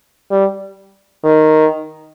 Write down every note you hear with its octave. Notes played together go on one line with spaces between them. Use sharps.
G3
D#3